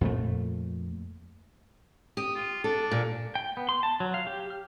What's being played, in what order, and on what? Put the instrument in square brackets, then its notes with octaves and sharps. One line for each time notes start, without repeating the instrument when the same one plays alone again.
[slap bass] F2 A#2 A3
[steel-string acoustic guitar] G4 [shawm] D#6
[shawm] F4
[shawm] D4 [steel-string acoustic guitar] A4
[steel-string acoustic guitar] A#2
[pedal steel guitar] G5
B3
C6
A5
F#3
F5
G4
F6